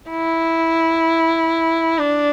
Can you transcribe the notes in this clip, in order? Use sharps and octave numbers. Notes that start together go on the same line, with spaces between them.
E4
D4